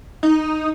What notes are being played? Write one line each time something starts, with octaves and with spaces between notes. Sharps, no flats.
D#4